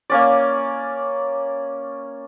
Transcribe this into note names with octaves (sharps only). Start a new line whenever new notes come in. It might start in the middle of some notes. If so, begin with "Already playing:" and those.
A#3 C#4 D5